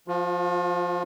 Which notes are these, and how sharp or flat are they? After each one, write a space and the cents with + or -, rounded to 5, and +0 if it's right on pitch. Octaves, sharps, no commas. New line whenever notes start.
F3 +0 F4 +40